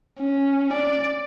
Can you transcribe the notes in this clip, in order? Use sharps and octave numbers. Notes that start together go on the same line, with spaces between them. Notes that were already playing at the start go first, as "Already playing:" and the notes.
C#4
D5